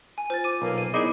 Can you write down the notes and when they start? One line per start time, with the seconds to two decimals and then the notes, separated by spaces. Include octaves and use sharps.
0.18 G#5
0.30 F4 C5 A6
0.44 D6 D#7
0.62 B1 A#3
0.78 D#7
0.94 B3 D#4 E4 G#4 D5 D#5 D6